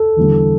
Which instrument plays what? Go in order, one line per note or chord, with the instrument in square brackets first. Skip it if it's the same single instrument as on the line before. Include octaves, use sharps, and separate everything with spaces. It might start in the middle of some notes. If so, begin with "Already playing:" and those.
Already playing: [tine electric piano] A4
[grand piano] E2 D3 G3